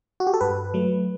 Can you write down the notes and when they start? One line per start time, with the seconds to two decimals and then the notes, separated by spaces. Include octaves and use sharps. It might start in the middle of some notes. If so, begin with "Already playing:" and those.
0.20 F#4
0.27 G4
0.34 A4
0.41 G2 B4
0.74 F#3 A3